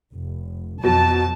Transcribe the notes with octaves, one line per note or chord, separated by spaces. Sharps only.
F1
F2 B2 F#3 A5